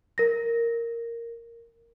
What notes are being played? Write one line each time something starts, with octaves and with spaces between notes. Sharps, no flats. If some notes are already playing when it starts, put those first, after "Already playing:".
A#4 A#6